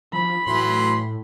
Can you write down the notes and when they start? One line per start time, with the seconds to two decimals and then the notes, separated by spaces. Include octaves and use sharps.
0.13 F3 B5
0.47 A2 E3 F#3 C6